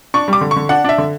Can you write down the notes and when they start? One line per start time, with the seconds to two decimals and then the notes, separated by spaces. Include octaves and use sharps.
0.14 D4 C#6
0.28 G3 D6
0.41 D3
0.51 C#6
0.56 D3
0.69 D4 F#5
0.84 D4 E5
0.98 D3